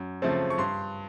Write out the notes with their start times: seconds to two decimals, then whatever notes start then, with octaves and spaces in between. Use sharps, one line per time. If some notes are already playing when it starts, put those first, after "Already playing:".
Already playing: F#2
0.22 C#3 F3 A3 C4
0.50 C#6
0.58 G2 C6